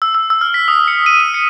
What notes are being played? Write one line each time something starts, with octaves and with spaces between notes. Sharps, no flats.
E6
E6
E6
F6
B6
D#6
C#7
D#7
D#7
C#7